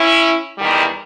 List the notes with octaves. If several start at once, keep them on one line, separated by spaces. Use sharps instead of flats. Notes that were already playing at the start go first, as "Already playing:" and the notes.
Already playing: C#4 E4
E2 D#3 G3